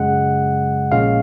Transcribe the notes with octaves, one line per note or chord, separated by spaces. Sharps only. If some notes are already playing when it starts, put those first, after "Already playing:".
Already playing: F#2 C#3 G#3 F#5
A#1 A#2 G#3 C#4 F5